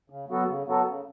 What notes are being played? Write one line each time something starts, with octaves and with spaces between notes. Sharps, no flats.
C#3
F#3 B3 F#4 A4
C#3
F#3 B3 F#4 A4
C#3